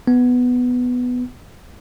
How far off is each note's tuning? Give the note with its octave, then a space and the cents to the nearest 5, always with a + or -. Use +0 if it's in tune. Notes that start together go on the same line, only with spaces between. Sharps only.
B3 +5